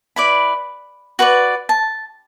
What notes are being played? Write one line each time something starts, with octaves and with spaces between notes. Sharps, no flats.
E4 B4 D5 B5
F#4 B4 D5
A5